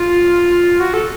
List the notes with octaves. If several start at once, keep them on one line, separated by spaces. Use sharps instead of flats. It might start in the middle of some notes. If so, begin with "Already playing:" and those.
Already playing: F4
F#4
A4